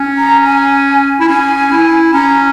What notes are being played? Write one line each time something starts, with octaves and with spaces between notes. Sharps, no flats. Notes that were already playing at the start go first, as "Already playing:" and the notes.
Already playing: C#4
A#5
G#5
E4
C#4 G#5
E4
C#4 A#5